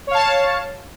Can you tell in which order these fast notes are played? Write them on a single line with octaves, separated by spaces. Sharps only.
C#5 F5 A5